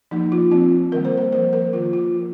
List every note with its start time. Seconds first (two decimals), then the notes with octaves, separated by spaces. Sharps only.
0.11 F3 A#3 D#4
0.32 F4
0.51 F3 C4 F4
0.92 D#3 G3 A#3 A#4
1.05 C5
1.18 A#4
1.32 F3 A#3 C5
1.53 A#4
1.73 D#3 A#3 F4
1.93 F4
2.13 F3 A#3